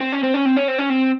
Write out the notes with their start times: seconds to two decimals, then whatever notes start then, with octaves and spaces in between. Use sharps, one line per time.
0.01 C4
0.12 C#4
0.23 C4
0.34 C#4
0.46 C4
0.57 C#4
0.68 C4
0.79 C#4
0.90 C4